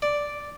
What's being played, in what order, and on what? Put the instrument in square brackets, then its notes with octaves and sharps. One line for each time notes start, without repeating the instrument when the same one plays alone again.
[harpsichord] D5